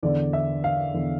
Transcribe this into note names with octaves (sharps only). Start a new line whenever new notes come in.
E2 D3 D5
E5
F5
E2 D3